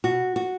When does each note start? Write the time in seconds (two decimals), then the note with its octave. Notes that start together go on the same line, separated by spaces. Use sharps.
0.04 B2 F#4
0.36 F#4